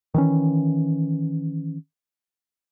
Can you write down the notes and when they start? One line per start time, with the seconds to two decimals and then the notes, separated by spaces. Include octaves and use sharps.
0.14 D#3 E3 C#4